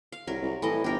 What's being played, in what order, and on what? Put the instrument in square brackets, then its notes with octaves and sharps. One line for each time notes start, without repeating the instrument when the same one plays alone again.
[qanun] F5
[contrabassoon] C2 [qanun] F#3 A#4
[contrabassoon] C2
[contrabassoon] A2 [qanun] E3 D#5
[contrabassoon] G1 [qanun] G4 A#4